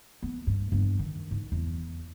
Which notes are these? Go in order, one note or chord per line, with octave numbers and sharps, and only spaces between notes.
B3
G2
G2 B3
D#3
G#2
E2